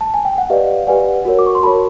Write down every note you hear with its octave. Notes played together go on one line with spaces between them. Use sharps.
A5
G#5
G5
F#5
G4 B4 D5 D#5 F5
G4 B4 D5 F#5 G#5
F#4 A#4 C#5
D6
C#6
C6
F#4 A#4 C#5 A5 B5